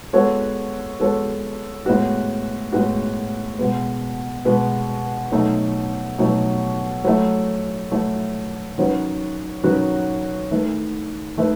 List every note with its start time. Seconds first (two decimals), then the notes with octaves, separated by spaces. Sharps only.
0.13 G#3 B3 F#4 A4 C#5
1.00 G#3 B3 F#4 A4 C#5
1.86 A2 G#3 B3 F#4
2.72 A2 G#3 B3 F#4
3.59 B2 G#3 B3
4.45 B2 G#3 B3
5.32 B2 F#3 A3 D#4 A4
6.18 B2 F#3 A3 D#4 A4
7.04 F#3 A3 E4
7.91 F#3 A3 E4
8.78 D#3 F#3 C#4 F#4 B4
9.64 D#3 F#3 C#4 F#4 B4
10.51 D#3 A3 E4 B4
11.37 D#3 A3 E4 B4